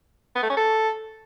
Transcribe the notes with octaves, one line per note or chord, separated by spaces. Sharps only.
B3
A3
C#4
A4